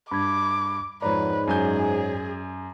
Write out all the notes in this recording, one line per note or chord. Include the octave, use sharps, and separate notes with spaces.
G2 B5 D6 G#6
F2 G#2 B4 C#5 D5 A#5
F#2 G#4 G#5 G6